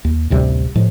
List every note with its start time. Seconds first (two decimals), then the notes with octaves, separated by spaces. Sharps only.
0.05 D#2
0.30 A1 D2 C3 G3
0.75 A2 F3 G#3